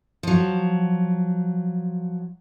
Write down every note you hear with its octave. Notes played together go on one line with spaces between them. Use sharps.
F3 F#3